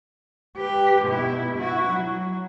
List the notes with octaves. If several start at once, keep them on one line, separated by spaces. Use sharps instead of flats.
G4 B4
B2 E4
E4 F#4
F#3